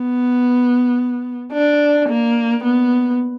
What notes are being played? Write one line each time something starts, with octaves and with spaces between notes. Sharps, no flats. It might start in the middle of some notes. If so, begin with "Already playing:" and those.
Already playing: B3
D4
A#3
B3